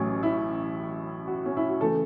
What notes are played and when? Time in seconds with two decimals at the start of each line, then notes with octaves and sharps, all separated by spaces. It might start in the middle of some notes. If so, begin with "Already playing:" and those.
Already playing: A1 A2 F#3 C#4
0.23 E4
1.27 F#4
1.45 C#4
1.57 E4
1.69 F#4
1.81 C#3 E3 A3 A4